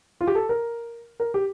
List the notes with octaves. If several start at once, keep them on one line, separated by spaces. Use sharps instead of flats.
F4
G4
A4
A#4
A#4
G4